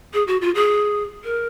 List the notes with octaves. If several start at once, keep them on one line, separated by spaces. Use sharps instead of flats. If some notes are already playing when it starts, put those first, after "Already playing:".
G#4
F#4
F4
G#4
A#4